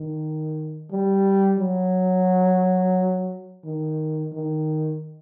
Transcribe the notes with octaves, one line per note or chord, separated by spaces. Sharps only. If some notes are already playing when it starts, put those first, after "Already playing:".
Already playing: D#3
G3
F#3
D#3
D#3